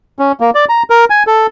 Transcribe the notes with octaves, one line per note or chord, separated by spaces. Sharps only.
C#4
A#3
D5
A#5
A#4
G#5
A4